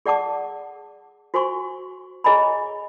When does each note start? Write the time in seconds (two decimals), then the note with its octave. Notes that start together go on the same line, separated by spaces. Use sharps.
0.06 G#4 D5 F#5 A5 D6
1.34 F#4 C5 G#5 C6 C#6
2.24 G#4 C#5 D#5 G#5 A#5 B5